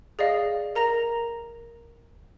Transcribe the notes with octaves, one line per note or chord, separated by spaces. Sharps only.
G#4 D5 D#5 F5
A#4 A#5 A#6 F7